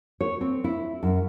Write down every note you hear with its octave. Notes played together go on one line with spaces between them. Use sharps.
C#5
C4
E4
F#2